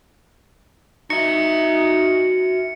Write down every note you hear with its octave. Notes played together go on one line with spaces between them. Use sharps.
D#4 F#4 E5 C#7